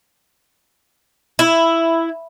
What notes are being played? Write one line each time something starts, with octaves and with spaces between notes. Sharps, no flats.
E4